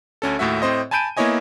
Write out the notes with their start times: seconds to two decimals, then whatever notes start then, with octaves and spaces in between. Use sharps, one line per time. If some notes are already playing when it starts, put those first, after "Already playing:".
0.22 D2 C#4 A4
0.39 D#2 A2 A3 F#4 E5
0.62 A2 C4 C5 D#5
0.91 G#5 A5 B5 G6 D7 D#7
1.17 A#3 B3 E4 C#5 D#5 G#5